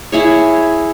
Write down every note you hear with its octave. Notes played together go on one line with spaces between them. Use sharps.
E4 G#4 C#5